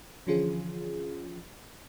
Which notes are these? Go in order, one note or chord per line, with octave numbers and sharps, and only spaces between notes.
D3 E3 F3 C#4 F4 G#4